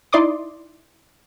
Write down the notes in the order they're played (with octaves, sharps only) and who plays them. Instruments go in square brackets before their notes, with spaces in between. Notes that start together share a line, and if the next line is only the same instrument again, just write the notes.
[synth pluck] D#4 E4 D5 C6 D6 D#6